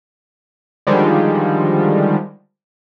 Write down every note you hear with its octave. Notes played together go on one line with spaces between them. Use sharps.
D3 D#3 F3 G3 G#3